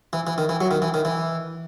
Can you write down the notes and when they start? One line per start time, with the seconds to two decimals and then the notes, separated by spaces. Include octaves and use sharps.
0.13 E3
0.27 E3
0.38 D#3
0.49 E3
0.61 F#3
0.71 D#3
0.82 E3
0.94 D#3
1.05 E3